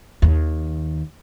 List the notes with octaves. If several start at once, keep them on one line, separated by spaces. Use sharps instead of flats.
D#2